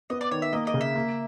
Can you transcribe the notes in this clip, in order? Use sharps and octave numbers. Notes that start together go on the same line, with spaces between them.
B3 D#5
D5
D#3 C#5
E5
A#3 D#5
D#5
C#3
E5
A#3